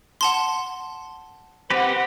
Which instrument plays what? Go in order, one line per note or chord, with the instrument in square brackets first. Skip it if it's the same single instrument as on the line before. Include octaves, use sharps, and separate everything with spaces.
[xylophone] F#5 A5 C6
[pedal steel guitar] C4 G4 B4 [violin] C5 F#5